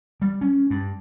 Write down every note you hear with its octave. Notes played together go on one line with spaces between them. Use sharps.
G3
C#4
G2